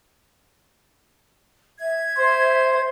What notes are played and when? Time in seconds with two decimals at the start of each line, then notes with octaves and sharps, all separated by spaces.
1.79 E5 G#6
2.17 C5